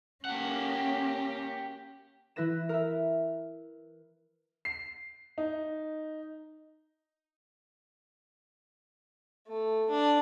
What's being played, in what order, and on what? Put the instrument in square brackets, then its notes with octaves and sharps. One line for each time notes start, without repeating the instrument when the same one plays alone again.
[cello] A#3 C#4 [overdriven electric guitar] G4 F#5
[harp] E3 E4 B4 A#6 E7
A#4 E5
[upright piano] C7
D#4
[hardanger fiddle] A3
D4